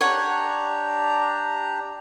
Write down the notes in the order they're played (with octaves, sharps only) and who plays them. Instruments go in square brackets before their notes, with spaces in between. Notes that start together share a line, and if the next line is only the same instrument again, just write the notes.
[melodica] D4 G4 A#5 [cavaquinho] C#5 F#5